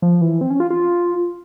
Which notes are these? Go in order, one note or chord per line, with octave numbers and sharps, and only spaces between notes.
F3
E3
C4
C#4
F4
F4